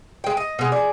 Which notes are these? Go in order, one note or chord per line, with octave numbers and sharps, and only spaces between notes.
G#3 G5
D#5
B2 G#3
G#4 D5